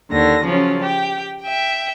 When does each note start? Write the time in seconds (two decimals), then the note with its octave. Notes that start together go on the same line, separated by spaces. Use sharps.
0.10 D#2 D3 A#6
0.45 C#3 F3 F#3 C#4
0.83 G4 G5
1.42 E5 G5